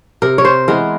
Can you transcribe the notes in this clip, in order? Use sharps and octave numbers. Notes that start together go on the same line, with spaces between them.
C3 A#4
C#5
C5
E3 G#3 B3 A#4